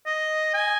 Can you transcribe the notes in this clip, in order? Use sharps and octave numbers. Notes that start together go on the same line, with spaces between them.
D#5
G#5